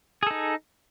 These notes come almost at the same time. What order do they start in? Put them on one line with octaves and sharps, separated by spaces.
G#4 A4 D#4